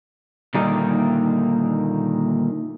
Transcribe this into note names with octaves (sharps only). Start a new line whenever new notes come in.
A#2 D3 D#3 G3 A#3 D#4